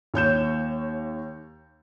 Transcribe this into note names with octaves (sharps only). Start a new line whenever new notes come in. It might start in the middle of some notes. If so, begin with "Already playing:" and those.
D#2 C#5 G6 E7